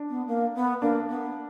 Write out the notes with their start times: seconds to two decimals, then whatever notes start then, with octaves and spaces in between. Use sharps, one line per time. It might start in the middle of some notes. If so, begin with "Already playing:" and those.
Already playing: D4
0.10 B3
0.27 A#3
0.55 B3
0.81 A#3 D4
1.09 B3